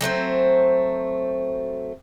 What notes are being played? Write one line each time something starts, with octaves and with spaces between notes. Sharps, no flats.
F#3 A3 C4 C5